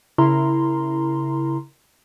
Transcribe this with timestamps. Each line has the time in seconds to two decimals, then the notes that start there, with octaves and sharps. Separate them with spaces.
0.18 C#3 E4 A#4 A#5 C6